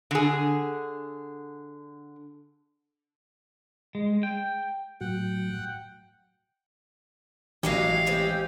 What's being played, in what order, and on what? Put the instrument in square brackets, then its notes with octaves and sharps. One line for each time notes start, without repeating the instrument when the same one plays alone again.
[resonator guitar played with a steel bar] D3 G#4
[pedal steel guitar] G#3
G5
[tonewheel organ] A2 F#3 [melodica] F#5 G5
[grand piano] A1 [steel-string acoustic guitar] F#3 G#3 G4 [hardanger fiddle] F5
[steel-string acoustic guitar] G#3 C4 C#4 [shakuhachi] G4